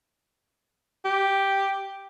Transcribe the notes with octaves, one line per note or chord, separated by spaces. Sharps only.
G4